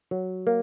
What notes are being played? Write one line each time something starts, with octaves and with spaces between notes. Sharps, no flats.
F#3
A#3